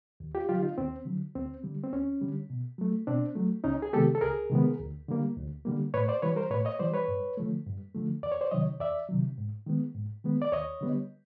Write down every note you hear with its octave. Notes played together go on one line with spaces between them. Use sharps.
D#2
F4 G4
D3 F#3 F4 G4
D#4 F4
D#2 C4
D3 F#3
D2 C4
D3 G3
C4
D2 C#4
D3 G3
B2
F#3 A3
B2 C4 D4
F#3 A3
C#2 C#4 D#4
G#4
C3 D#3 G#3 B3 G4 A4
A4
C#2 G#4 A#4
C3 D#3 G#3 B3
D2
D3 G3 A#3
D2
D3 G3 A#3
A2 B4 C#5
C5 D5
E3 G3 B4 C#5
A#4 C5
A2 B4 C#5
C#5 D#5
E3 G3 C5 D5
B4 C#5
G2
D3 F3 A3
G2
D3 F3 A3
E2 D5
C#5
C5 D5
C3 D#3 F#3 C#5 D#5
E2 D5 E5
C3 D#3 F#3
G#2
D#3 G#3 B3
G#2
D#3 G#3 B3
D5
D#2 C#5 D#5
D3 G3 B3